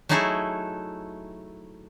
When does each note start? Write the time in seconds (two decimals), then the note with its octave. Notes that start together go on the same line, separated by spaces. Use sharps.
0.09 F#3 A3 D#4 E4 G#4 A4